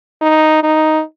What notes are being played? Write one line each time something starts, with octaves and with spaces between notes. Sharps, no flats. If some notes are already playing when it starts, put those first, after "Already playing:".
D#4
D#4